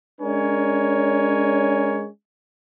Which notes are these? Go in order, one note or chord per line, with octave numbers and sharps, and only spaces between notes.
G#3 C#4 D4 A#4 C#5 G#5